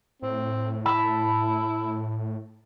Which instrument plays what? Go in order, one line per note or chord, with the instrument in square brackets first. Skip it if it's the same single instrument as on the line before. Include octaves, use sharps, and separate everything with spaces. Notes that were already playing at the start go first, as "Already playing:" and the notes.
[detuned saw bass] A2 [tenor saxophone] C4
[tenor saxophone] E4 [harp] A5 B5 E6